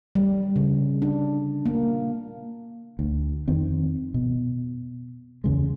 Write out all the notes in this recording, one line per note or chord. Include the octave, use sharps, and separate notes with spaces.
G3
C#3
D4
A#3
D2
F2 D#3 C4
B2
E2 C#3 G#3